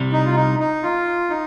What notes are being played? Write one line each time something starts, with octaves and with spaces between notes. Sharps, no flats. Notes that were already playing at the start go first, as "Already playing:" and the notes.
Already playing: C2 C3 G3
D#4
F4
D#4
D#4
F4
D#4